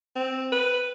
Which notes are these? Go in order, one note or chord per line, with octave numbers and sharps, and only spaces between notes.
C4
B4